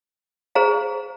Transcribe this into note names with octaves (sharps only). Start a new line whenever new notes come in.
G#4 C5 F5 A#5